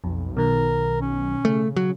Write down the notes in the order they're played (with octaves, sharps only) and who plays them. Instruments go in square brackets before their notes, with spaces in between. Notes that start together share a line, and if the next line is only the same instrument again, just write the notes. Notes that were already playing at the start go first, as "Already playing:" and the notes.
[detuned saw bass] B1 [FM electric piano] F2
[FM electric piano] B2 D#3 [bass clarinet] A#4
[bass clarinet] C#4
[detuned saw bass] C#3 [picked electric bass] A3
[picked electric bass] F#3